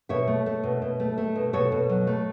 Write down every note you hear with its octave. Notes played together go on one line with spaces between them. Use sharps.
B2 C#5 E5
A3
A3
B2
B2
A3
A3
B2
B2 A4 C#5
B2
F#3
A3